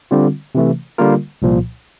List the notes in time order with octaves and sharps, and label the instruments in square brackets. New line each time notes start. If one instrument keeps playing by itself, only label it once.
[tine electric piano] D3 G3 C4 F4
C3 E3 A3
D3 G3 A#3 F4 A#4
C2 A#2 F3